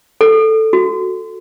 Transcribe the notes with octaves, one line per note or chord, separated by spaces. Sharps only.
A4
F#4